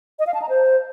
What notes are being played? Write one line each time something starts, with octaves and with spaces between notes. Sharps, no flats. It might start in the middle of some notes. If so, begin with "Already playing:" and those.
D#5
F5
A5
A#5
C5